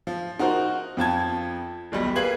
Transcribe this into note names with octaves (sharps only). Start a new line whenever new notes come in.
F3
D#4 F#4 A#4 C5
F2 F3 A5 G#6
D#1 B1 G3
A#3 G#4 B4 G#6 F#7